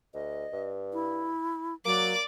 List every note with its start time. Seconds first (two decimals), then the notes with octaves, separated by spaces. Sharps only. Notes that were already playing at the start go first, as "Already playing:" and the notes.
0.14 D2 D#5
0.53 G2
0.93 E4
1.85 F#3 A#3 D5 D6